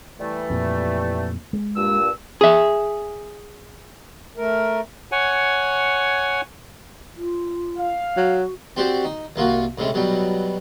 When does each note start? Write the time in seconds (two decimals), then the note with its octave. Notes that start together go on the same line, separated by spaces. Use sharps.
0.20 E3 G3 A3
0.50 F2 A#2
1.53 G#3
1.77 G2 A#2 E6
2.41 G#4 E5
4.37 A3 A#4
5.12 C#5 F#5 G#5
7.17 F4
7.78 F5
8.17 F#3 F#4
8.77 C4 F#4 G4 C5 D5
9.04 D#4
9.36 C2 A#3 F4 F#4
9.78 A2 C3 G#3 C#4
9.94 B2 F#3 G3